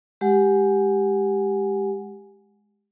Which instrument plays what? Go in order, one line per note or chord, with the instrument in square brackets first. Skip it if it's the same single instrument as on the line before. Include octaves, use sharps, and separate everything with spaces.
[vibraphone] G#3 G4 F#5 G#5